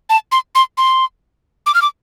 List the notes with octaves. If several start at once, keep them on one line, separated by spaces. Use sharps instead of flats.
A5
C6
C6
C6
D6
F6
D6